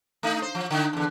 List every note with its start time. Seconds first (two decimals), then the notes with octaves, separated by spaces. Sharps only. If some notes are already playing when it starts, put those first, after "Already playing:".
0.23 A3 D#4
0.42 C5
0.55 F3
0.71 D3 D#4
0.93 E2 D3